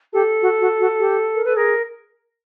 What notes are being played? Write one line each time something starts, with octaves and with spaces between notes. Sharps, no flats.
G4 A4
F#4
F#4
F#4
G4
A#4
A4 B4
G#4 A#4